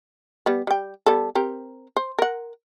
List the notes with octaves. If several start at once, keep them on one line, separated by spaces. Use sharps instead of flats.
G3 B3
G3 G5
G3 B3 A4
C4 G4 A#4
C5
A#4 F#5